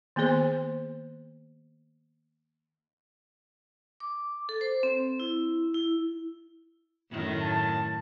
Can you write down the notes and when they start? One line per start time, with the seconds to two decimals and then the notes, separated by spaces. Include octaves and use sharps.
0.16 D#3 A#3 B3 G#4 C5
4.00 D6
4.49 A4
4.61 C5
4.83 C4
5.20 E4
5.74 E4
7.12 F#2 A2 D#3
7.42 A5